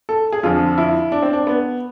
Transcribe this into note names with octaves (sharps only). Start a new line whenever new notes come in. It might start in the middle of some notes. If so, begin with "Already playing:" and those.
A4
G#4
F2 D3 F3 F4
E4
D4
C4
D4
B3